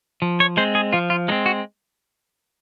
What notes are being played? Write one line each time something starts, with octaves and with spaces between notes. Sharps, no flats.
F3
C#5
G#3 C4 C5
G#4
F3 F4
F4
G#3 C4 D#4
F#4